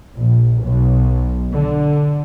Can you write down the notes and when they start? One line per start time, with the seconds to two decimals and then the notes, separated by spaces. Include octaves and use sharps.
0.16 A#1
0.63 B1
1.51 D3